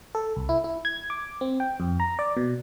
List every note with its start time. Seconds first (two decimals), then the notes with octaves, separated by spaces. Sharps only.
0.15 A4
0.36 C2
0.49 E4
0.64 E4
0.85 G#6
1.10 D6
1.41 C4
1.60 G5
1.80 F2
2.00 A#5
2.19 D5
2.37 B2